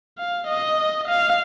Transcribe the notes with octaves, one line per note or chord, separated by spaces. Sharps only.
F5
D#5
F5